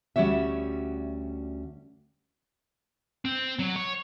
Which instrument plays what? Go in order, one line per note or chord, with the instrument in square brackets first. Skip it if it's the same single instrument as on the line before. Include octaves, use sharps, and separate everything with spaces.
[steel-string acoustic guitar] D2 G3 C#4 F#4 C#5 E5
[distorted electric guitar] C4
F#3
C#5